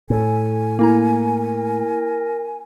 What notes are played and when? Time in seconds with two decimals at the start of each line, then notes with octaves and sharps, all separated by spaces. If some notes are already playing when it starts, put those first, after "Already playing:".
0.10 A2 A4 G#5
0.79 A#3 E4 A#4 A#5